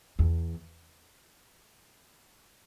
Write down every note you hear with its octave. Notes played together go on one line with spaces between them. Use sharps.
E2